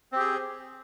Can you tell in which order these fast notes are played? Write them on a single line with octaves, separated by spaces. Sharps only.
C4 G4 G#4